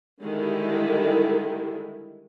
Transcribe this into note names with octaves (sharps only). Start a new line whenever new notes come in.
D3 D#3 G3 G#3 E4